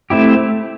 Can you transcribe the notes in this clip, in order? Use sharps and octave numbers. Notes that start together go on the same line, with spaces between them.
A3 C4 E4 G4